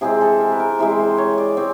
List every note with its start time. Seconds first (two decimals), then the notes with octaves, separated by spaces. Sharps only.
0.01 C3 E3 G#3 C4 G#4
0.21 A4
0.40 A#4
0.52 B4
0.60 A#4
0.79 C3 E3 G#3 C4 B4
0.99 C5
1.18 C#5
1.38 D5
1.57 G#3 C4 C#5